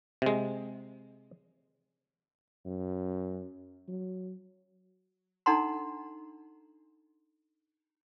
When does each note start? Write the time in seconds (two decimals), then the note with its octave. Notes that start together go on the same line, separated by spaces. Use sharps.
0.22 C3 G#3
2.65 F#2
3.88 F#3
5.46 D4 D#4 A4 F#5 A#5 C6